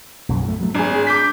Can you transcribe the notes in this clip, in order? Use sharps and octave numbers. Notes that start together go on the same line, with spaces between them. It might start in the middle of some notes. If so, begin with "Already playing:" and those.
B1 F#2
A2 A3
F#3 A3
G#1 D4 G#4
D6 G6 B6